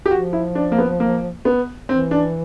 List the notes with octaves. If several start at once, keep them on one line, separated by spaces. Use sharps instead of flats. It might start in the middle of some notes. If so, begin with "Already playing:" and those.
G4
F3 F#4
E4
D4
A#3
B3
A#3
B3
E3 C4
D4